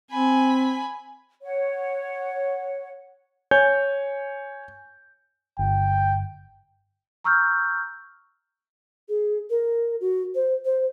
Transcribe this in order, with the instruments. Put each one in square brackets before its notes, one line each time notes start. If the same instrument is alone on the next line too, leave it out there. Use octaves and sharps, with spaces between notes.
[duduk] C4 [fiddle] G#5 B5
[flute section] C#5 F#5
[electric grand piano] C#5 G#5 G6
[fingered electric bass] G1 [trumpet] G5
[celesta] A#5 C#6 E6 F6 G6
[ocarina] G#4
A#4
F#4
C5
C5